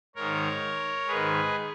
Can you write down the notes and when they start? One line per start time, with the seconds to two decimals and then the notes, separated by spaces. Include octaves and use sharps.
0.16 G#2 D#3 A#4 C#5
1.08 G#2 D#3 G#4 B4